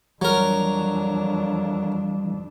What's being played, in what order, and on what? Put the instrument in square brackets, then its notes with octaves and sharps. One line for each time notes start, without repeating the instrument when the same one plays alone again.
[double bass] F2 D4 [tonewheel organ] E3 G3 [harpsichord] F#3 A#4